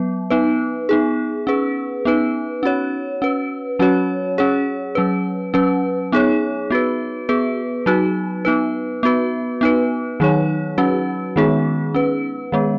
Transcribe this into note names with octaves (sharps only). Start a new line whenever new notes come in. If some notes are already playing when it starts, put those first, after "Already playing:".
Already playing: F#3 B3
B3 D#4 B4
B3 D#4 G#4
C#4 G#4 B4
B3 D#4 B4
C#4 F#4 C#5
C#4 B4
F#3 C#4 F#4 C#5
C#4 G#4 C#5
F#3 C#4 B4
F#3 C#4 B4
B3 D#4 G#4 C#5
B3 F#4 B4
B3 G#4 B4
F#3 D#4 F#4 B4
B3 D#4 B4
B3 F#4 B4
B3 D#4 B4
D#3 F#3 D#4 G#4 C#5
F#3 C#4 F#4 B4
D#3 G#3 B3 D#4 G#4
C#4 B4
D#3 G#3 B3